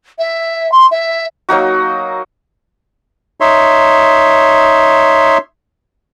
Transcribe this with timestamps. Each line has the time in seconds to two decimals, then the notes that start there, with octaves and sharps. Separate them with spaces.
0.18 E5
0.71 C6
0.91 E5
1.49 F#3 A#3 D#4 F#4
3.41 D#4 C#5 E5 C6